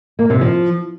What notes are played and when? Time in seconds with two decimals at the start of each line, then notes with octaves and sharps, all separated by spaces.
0.19 A#3
0.30 C3
0.41 F3